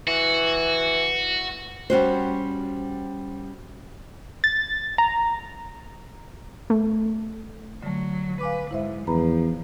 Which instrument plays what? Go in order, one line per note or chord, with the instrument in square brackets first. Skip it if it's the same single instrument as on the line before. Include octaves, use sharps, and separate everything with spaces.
[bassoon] E3 [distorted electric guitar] F#4
[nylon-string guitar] G3 C#4 F#4 C5
[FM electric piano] A6
A#5
[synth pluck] A3
[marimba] D3 A3 [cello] F#3
[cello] B4 [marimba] F5 G#5 D6
[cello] G#2 [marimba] E4 C5 E5
[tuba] E2 [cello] F3 [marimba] B4 A#5 B5